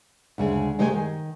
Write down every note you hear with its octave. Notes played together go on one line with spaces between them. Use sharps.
D2 C#3 G#3 G#5
C3 G#3 A3 G4 D5 G#5
D#3